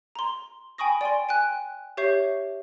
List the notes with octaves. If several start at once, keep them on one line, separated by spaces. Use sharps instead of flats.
A#5 C6
G5 G#5 B5 C#6 D#6 A#6
D5 G5 G#5 C6
G5 G#5 F#6
G4 C#5 E5 C#6 G6 C7